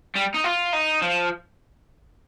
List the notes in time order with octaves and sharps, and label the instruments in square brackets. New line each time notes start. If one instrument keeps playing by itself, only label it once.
[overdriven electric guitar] G3
D#4
F4
D#4
F3